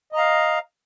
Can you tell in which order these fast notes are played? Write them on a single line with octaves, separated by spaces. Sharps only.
D#5 A#5 F5